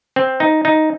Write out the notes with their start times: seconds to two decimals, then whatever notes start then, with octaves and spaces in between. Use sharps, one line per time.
0.16 C4
0.40 D#4
0.65 D#4